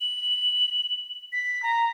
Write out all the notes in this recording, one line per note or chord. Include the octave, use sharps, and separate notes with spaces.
F#7
B6
A#5